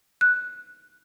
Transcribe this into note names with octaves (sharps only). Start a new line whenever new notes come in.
F#6